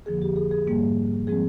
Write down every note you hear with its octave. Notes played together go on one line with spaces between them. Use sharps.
F2 D3 F3 A#3 G#4
G4
G#4
G#4
G#2 G3 A#3
F3 G#3 C4 G#4